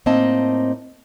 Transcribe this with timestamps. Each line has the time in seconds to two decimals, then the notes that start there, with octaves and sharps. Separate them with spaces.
0.06 A2 A#3 C4 D#4 D#5 A5